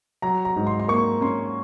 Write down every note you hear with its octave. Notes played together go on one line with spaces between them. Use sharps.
F#3 A#5
A#5
G#2
C6
C6
A#3 C#6
C#4 C6